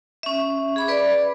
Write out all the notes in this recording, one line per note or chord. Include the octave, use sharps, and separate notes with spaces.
C#4 E5
G#4 B5 D6
B4 D5